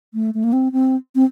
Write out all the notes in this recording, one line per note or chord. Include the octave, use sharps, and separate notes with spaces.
A3
A3
A#3
C4
C4
C4